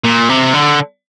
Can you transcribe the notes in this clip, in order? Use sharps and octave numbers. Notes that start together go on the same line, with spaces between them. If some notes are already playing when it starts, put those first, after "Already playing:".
A#2
C3
D3